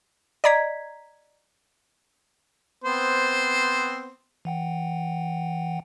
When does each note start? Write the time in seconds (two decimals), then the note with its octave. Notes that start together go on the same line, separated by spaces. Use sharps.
0.44 D5 D#5 A#5 G#6 B6
2.84 B3 C4 C5
4.45 E3 F#5 G5